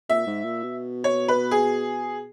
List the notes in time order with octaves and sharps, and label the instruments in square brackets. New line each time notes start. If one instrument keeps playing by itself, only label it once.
[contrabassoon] A#2 [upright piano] E5
[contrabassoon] G#2
A#2
B2
[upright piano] C#5
B4
G#4